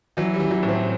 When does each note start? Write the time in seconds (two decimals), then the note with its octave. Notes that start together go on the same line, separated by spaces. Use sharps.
0.17 E3 F#3
0.34 G3
0.40 E3
0.51 F#3
0.63 A2
0.68 C4